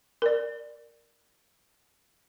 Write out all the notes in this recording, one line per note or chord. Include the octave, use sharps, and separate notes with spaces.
A#4 D5